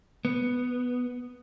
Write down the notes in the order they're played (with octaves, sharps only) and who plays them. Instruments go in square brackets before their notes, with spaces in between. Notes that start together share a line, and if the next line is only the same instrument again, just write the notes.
[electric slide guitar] B3